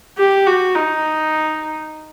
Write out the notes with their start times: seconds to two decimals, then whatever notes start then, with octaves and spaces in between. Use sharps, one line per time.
0.18 G4
0.47 F#4
0.75 D#4